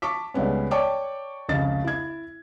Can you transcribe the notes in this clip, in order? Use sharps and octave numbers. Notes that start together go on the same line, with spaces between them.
A5 C#6 D6 B6
C#2 G3 G#3 B3 C#4
C#5 D5 G5 A5 C#6 D6
F1 C#2 C#3 A6
E4 G#6